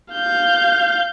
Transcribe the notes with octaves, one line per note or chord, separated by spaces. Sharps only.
F5 G6